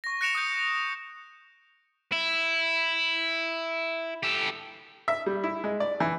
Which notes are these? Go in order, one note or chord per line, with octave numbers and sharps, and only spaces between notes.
C#6 A#6
F#6 A#6 C#7 D7 E7 F7
D#6 F#6 G6 C#7
E4
G4 A4
E5
G3
E4
G#3
D5
E3